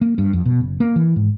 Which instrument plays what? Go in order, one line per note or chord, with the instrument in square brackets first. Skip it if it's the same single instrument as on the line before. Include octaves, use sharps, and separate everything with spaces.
[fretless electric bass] A#3
G2
F2
B2
F#1
A#3
E3
G#2